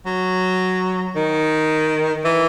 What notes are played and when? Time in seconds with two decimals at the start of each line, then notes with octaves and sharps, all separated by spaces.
0.06 F#3
1.15 D#3
2.25 E3